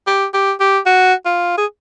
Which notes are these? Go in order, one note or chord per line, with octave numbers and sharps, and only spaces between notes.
G4
G4
G4
F#4
F4
G#4